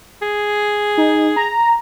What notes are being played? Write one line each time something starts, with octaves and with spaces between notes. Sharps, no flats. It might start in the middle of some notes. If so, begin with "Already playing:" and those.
G#4
D#4
A#5